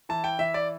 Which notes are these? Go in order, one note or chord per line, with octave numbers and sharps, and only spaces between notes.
E3 A5
G5
E3 E5
D5